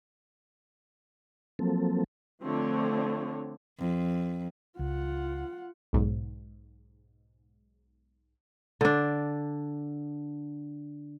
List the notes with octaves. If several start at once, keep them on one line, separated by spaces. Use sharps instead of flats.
F3 F#3 A#3 C4 A4
D3 F3 A3 C4 D4 C#5
F2
C#2 F4 F#5
B1 G#2
D3 D4